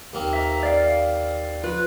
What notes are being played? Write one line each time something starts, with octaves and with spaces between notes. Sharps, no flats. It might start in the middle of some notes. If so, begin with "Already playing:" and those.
D#2 A#3 C4
E5 A#5
D5 F5
F3 F4 B4